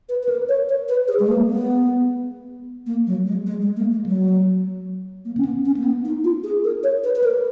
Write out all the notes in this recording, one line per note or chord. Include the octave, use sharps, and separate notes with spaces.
B4
B4
A#4
C#5
C#5
B4
G#4
G#3
A#3
B3
A#3
F#3
G#3
G#3
G#3
A#3
G#3
F#3
A#3
C#4
B3
C#4
A#3
B3
D#4
F4
G#4
A#4
C#5
B4
B4
A#4